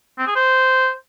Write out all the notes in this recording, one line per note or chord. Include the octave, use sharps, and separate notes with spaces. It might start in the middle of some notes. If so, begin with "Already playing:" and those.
C4
G#4
C5